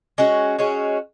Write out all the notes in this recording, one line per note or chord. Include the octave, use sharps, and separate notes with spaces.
G#3 C#4 F#4
G#3 C#4 F#4